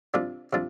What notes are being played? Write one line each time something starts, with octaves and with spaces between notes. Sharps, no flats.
C3 G3 D4 F4
C3 G3 D4 F4